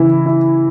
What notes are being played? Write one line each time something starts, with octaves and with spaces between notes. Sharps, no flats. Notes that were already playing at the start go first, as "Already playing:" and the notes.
Already playing: C#3 E3 E4
E4